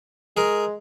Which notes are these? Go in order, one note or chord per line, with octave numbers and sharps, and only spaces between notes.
G#3 G#4 A#4